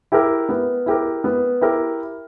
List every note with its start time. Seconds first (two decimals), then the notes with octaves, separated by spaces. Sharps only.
0.12 E4 G4 A#4
0.49 B3
0.86 E4 G4 A#4
1.24 B3
1.61 E4 G4 A#4